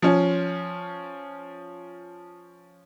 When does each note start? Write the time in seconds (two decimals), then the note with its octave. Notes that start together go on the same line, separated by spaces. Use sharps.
0.02 F3 C#4